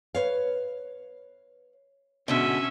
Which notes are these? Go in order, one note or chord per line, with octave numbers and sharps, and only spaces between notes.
B4 C#5 F5
G#2 B2 D3 C#4 E5